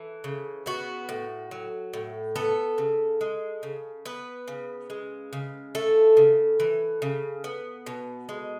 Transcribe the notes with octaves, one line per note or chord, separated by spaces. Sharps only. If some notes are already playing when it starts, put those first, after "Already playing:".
Already playing: E3 A4
C#3
B3 F#4
A2
F#3
A2
B3 A4
C#3
G#3
C#3
B3 B4
C#3
G#3
C#3
A3 A4
C#3
E3
C#3
B3
B2
G#3